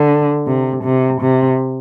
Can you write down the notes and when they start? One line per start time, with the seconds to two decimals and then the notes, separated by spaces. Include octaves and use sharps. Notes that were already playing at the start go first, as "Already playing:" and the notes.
Already playing: D3
0.47 C3
0.84 C3
1.21 C3